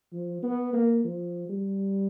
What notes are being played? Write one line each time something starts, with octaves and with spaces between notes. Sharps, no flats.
F3
B3
A#3
F3
G3